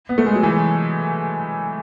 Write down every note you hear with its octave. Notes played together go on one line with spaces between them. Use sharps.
B3
A3
G#3
F#3
E3